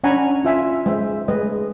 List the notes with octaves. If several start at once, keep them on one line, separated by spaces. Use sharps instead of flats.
C#4 D4 F#5 G#5 A#5 B5
D4 F4 E5 G#5
G#3 C5 E5
G#3 A3 G#4 B4 D#5